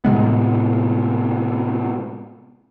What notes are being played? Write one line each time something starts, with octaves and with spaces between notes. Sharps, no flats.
A2 C3 G#3 B3